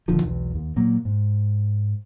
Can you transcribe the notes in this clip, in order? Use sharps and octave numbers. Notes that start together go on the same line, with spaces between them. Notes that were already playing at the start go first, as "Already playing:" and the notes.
D#1 D3 D#3 F3
B1 E2
D#2
A#2 F#3 A#3
G#2